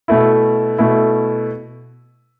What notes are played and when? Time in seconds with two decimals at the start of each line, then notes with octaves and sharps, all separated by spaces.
0.08 B2 A3 E4
0.78 B2 A3 E4